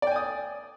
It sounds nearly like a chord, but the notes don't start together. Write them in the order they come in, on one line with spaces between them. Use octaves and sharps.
D5 G5 G#5 D#6